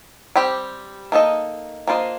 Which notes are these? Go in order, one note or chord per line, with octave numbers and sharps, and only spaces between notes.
G3 C4 G4
A#3 D#4 A4 D#5
A#3 D4 F4 C5 D#5